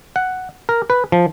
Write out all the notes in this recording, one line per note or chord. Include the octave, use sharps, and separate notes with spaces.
F#5
A#4
B4
F3